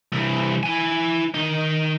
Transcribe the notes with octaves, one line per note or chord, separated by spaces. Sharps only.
C2 E3
E4 G#5
D#3 D#4